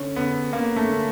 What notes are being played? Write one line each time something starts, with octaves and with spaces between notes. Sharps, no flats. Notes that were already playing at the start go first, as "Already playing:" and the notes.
Already playing: D3 C#4
D3 B3
D3 A#3
A3
D3